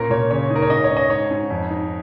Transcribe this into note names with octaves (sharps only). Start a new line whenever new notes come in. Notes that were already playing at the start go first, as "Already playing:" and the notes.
Already playing: A#2 C#4 A#4
A#2 C#5
C#3 C#5
D#4
A#4
C#5
G#2 D#5
C#5
C#4
D#5
G#2 C#5
G#2
F2
D#4